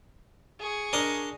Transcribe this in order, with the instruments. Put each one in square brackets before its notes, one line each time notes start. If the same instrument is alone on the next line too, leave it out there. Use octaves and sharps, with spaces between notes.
[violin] G#4 C#6
[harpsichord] D4 A#4 D#5